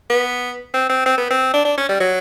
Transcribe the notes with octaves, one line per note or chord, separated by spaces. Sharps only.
B3
C4
C4
C4
B3
C4
D4
D4
C#4
G3
F#3